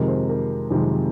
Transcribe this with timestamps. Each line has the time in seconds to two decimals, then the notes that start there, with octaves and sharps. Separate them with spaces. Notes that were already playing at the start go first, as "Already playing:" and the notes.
Already playing: F2 C3 D#3 G#3 A#4
0.08 C5
0.29 A#4
0.70 F2 C3 D#3 G#3